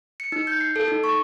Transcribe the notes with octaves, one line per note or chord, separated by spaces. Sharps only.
C#7
D#4
G6
C7
A4
D#4
C#6